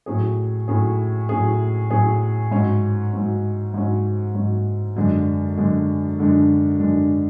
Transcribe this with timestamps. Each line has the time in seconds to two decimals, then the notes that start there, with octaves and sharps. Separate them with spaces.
0.06 A2 F#3 C#4 G#4
0.68 A2 F#3 C#4 G#4
1.29 A2 F#3 C#4 G#4
1.90 A2 F#3 C#4 G#4
2.51 G#2 F#3 C#4
3.12 G#2 F#3 C#4
3.74 G#2 F#3 C#4
4.35 G#2 F#3 C#4
4.96 F#2 D3 G#3 D4
5.57 F#2 D3 G#3 D4
6.18 F#2 D3 G#3 D4
6.80 F#2 D3 G#3 D4